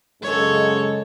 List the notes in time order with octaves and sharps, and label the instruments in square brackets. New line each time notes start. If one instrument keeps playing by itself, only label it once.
[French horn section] F#2 C#3 G#3 [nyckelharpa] A4 C#5